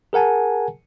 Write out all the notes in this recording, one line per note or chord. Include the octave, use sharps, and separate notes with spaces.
G#4 A#4 F#5 G#5 A5